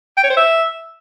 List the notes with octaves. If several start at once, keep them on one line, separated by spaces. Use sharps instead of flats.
G5
C#5
C5
E5